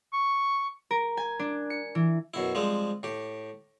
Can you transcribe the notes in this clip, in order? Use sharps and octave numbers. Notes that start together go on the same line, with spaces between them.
C#6
A#4
G#5
D4
C#7
E3
F#2 B2 E4
F3 G3 G#3 C4
A2 G4